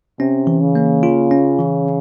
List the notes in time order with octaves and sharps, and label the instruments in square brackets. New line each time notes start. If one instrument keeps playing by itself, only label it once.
[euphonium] C3 [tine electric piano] C#4
[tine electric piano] E3
[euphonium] C#3
[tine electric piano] A#3
F4
C#4
E3